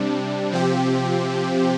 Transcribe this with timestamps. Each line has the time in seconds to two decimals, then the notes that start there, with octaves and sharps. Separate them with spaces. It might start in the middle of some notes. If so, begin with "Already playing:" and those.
Already playing: C3 G3 D4
0.52 C3 F3 C4 G4